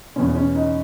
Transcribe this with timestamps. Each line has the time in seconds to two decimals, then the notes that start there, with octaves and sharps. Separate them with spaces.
0.16 E2 B2 C#4
0.35 C#4
0.55 D#4